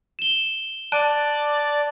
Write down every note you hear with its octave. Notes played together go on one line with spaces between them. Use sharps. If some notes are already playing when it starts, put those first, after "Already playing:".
E7 G7
D5 A5 F#6 D7